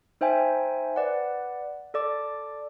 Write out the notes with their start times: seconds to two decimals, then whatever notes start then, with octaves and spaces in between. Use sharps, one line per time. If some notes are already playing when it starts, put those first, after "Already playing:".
0.21 D#4 C5 E5 G5 G#5
0.96 B4 D5 F#5
1.94 A4 D5 D6